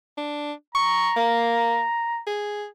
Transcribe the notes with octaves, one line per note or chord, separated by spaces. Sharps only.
D4
A#5 C#6
A#3
G#4